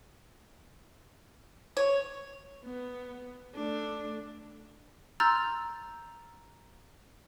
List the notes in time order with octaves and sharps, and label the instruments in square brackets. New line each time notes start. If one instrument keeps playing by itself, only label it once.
[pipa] C#5
[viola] B3
A3 D4
[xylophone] A#5 C6 E6 F6 G6 A6